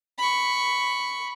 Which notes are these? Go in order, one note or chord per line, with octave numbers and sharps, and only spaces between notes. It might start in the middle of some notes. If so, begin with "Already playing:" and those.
B5 C#6